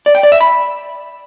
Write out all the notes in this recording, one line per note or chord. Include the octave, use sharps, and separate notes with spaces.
D5
G5
D5
E5
B5